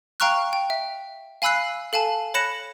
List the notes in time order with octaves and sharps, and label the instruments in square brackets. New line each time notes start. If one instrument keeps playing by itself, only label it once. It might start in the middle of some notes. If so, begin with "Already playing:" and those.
[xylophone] F5 G5 A#5 C#6 F6 F#6
G5
E5
F5 G#5 B5 E6 F#6 C7
A4 F5 G#5 A5
C#5 B5 F#6 A#6 C#7 E7